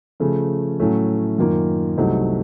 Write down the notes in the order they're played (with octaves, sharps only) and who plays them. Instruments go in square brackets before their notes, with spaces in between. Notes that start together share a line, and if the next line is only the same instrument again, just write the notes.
[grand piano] C#3 F3 A3
A2 F#3 A3 C#4
F#2 D#3 A#3 F4
C2 C3 F#3 A3 D#4